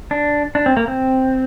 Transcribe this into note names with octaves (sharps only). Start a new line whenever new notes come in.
D4
D4
C4
A#3
C4